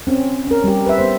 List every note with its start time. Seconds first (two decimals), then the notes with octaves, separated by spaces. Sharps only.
0.07 C4 C#4
0.47 C#4 A#4
0.64 G3 G4
0.86 B4 E5
0.98 B3 C5